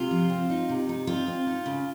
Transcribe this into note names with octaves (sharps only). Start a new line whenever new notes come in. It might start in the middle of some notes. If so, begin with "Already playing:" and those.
Already playing: C3 F4
F3
C4
D#4
C3
D#4
C4 F4
C4
D#4
C#3